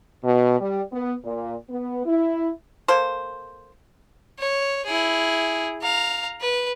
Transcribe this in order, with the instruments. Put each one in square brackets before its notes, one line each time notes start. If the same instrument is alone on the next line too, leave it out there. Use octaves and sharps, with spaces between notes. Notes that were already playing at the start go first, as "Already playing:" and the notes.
[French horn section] B2
G3
B3
A#2
B3
E4
[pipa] A#3 A4 C5
[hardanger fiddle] C#5
E4 G#4
F5 A#5
B4